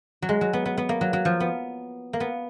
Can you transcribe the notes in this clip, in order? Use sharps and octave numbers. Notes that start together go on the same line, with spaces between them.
F#3
G#3
F#3
B3
B3
B3
A#3
F#3
F#3
F3
B3
A#3
B3